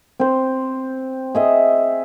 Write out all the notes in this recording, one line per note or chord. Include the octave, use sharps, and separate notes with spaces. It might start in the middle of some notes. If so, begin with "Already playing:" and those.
C4 C5
G#4 D#5 E5